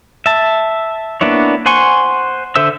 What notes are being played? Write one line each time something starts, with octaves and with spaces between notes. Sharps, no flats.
E5 A5
A#3 B3 D4 E4 C#5
C5 F#5 G#5 C6 C#6
D3 A4 C5 E5 E6